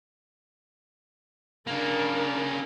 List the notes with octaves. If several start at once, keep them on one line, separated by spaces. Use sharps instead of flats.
C#3 A#3 D4 A#4